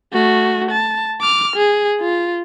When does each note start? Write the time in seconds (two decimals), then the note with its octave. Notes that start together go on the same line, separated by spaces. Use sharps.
0.13 A3 F#4
0.71 A5
1.21 D6 F6
1.56 G#4
2.01 F4